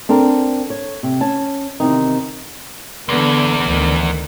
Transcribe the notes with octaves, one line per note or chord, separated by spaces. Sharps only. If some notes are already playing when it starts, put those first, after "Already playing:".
C4 D4 A4 A#4
C#5
C3
C#4 A5
E2 C3 D#3 C4 D#4
E2 D3 B3
D2 D#3